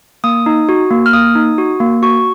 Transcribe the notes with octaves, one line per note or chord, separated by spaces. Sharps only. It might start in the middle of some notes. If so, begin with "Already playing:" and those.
A#3 D#6
D#4
F#4
A#3
F6
A#3 D#6
D#4
F#4
A#3
F#4 C#6